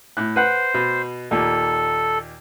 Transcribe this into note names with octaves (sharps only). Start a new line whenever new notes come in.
A2 F#6
B4 C5 F#5 F#6
B2
D#2 A#2 A4